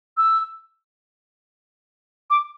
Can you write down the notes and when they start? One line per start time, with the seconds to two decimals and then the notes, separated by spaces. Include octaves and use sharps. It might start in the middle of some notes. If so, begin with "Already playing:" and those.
0.17 E6
2.30 D6